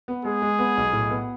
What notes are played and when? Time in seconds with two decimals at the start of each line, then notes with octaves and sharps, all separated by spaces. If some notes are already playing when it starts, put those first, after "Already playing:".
0.08 B3
0.25 G#3 G#4
0.42 G#3
0.59 B3
0.77 B1
0.93 A2
1.10 B3